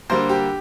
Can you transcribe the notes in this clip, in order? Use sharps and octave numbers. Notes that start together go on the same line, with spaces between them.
D3 G3 A#3 C5
G4